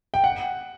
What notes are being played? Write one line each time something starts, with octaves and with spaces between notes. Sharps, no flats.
G5
F#5